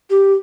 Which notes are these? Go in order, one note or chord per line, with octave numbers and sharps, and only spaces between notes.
G4